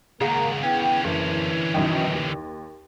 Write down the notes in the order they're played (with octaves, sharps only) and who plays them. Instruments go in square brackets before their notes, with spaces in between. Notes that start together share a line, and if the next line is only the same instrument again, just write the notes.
[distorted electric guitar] C#2 D#3 [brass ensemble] A#3 A#5 [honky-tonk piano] G#4 F5 F#5
[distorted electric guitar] D3 C#4 [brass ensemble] B3 E4 G5
[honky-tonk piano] F#1 [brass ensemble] E3
[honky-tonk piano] F#2 B2 D#3
D#2